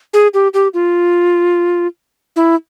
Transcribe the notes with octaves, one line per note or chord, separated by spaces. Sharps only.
G#4
G4
G4
F4
E4